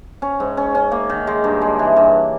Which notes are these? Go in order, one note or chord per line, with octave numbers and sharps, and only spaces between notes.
C#4
G#2
C#4
C#4
A#3
D#3
G#3
G2
G#3
E3
G2